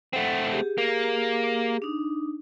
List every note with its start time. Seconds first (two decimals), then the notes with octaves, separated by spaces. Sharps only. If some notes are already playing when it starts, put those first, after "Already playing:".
0.13 A3 C4 F#5
0.52 G4 G#4
0.78 A#3
1.82 D4 D#4